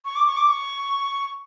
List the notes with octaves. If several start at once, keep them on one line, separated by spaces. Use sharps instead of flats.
C#6
D6
C#6
D6
C#6